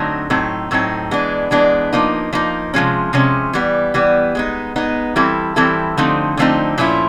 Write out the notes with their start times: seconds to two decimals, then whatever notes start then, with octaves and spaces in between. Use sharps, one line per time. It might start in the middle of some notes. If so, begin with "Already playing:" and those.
Already playing: D3 F#3 A3 C4 D#4
0.30 A2 F#3 A3 C4 D#4
0.71 A2 F#3 A3 C4 D#4
1.11 E3 G#3 B3 D4
1.51 E3 G#3 B3 D4
1.93 F3 A#3 D#4
2.33 F3 A#3 D#4
2.74 C3 F3 G#3 C#4
3.13 C3 F3 G#3 C#4
3.53 E3 G3 B3
3.94 E3 G3 B3
4.35 G#3 B3 D#4
4.76 G#3 B3 D#4
5.16 E3 G3 C4 E4 A4
5.56 E3 G3 C4 E4 A4
5.97 D3 F3 A3 C4 D#4
6.37 D3 F3 A3 C4 D#4
6.78 A#2 F3 A3 C#4 E4